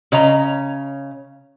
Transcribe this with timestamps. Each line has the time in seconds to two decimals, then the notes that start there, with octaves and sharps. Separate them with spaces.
0.12 C#3 C#5 D#5 A#5